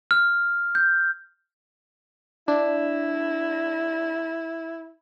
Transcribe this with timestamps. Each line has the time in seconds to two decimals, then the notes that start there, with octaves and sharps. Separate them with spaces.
0.11 F6
0.75 G6
2.48 D4 E4